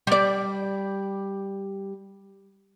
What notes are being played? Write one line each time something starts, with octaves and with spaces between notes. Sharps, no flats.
G3 D5